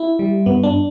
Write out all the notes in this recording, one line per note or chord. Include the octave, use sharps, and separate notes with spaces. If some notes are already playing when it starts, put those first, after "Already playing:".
Already playing: E4
G3
G2 B3
D4